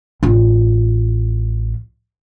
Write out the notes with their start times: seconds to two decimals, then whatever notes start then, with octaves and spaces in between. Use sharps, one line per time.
0.23 A1 F4